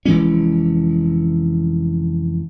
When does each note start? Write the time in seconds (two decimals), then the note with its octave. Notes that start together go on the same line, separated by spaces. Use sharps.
0.06 F1 E3 G#3 C#4